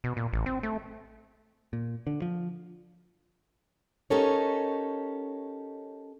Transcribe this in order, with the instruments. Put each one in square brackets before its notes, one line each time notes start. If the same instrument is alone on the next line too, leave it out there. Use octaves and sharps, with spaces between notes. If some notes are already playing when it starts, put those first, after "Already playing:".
[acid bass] B2
A#2
A1
C4
A3
[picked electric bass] A#2
D3
F3
[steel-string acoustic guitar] C#4 D#4 G4 A4 A#4 C#5